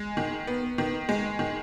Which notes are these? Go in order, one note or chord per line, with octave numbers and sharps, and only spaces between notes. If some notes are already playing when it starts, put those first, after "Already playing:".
Already playing: G#3
D#3
B3
D#3
G#3
D#3